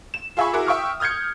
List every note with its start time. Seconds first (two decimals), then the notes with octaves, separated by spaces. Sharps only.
0.14 E7
0.37 F4 G#4 E5 G#5 B5 C#6
0.53 E4 F#4 G#4 A#4 D6
0.66 E5 G5 C#6 D#6 F6
1.00 D#6 F6 G6 G#6 C#7